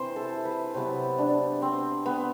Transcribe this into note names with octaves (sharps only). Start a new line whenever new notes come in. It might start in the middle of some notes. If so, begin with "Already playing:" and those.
Already playing: C3 E3 C5
A4
B4
C3 F#3 B3 C5
D4
C4
B3